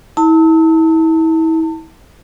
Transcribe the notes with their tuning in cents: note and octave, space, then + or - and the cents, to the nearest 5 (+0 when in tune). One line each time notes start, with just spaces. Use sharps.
E4 -35 A5 +30